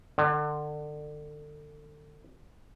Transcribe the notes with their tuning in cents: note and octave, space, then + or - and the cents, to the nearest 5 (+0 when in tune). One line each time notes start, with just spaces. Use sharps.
D3 +30